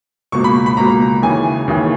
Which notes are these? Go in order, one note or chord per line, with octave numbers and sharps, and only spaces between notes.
C#2 B2 A#3 C#6
B5
B5
C#2 B2 A#3 A#5
D#2 C#3 E3 G#5
D#2 C#3 E3